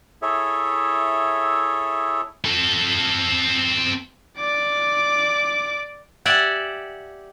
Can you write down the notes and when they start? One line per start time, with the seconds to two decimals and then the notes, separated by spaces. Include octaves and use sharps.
0.22 E4 G#4 A4 C#5 E5
2.45 C4 A4
4.38 D5 D6
6.26 G4 D5 E5 F#5 G#5